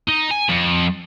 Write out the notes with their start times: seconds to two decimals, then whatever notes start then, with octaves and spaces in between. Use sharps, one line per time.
0.08 D#4
0.31 G#5
0.50 F2